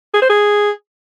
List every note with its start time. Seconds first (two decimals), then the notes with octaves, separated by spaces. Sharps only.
0.14 G#4
0.22 C5
0.30 G#4